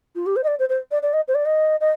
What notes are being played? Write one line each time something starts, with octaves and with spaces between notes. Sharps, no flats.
F4
G4
C5
D#5
D5
C5
C5
D5
D5
D#5
C5
D5
D#5
D#5